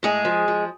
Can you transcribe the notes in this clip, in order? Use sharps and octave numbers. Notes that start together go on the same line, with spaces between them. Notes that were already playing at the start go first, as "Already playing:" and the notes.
A2 G#3 G#4
F3
F3